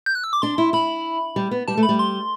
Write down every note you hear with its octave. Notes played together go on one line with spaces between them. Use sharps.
G6
F#6
E6
D6
D4 C6
E4
E4 B5
G3
B3
G3 A5
A3
B5
G3
C6